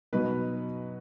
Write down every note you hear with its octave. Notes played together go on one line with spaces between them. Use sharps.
B2 F#3 B3 D#4 B4